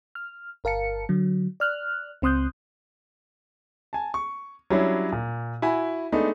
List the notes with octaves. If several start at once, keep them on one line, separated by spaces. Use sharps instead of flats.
F6
G1 A#4 F5 A5 C#7
D3 F#3
D5 F6 F#6
C#2 C4 C6 D#6 F#6 G6
G#5 A5
C#6
F#3 G3 C#4 D4 E4
A#2
E4 F#4 G#5 B5
G#3 A3 B3 D4 D#4